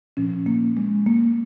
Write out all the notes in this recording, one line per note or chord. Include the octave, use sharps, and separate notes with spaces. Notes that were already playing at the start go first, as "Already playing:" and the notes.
A#2 F3 C#4
A#3
G#3
A#3